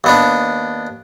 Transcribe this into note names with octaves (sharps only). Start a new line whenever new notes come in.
D#2 B3 D4